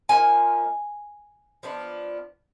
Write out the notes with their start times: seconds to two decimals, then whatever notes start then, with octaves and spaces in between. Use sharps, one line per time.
0.09 F3 A#3 D#4 G#5
1.63 F3 B3 D4